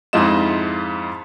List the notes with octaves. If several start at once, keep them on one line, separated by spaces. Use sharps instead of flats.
F2 G#2 E4 F4 D#5 E7